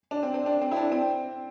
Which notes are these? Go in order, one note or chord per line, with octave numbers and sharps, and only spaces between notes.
D4
C4
C4
D4
C4
E4
D4
C4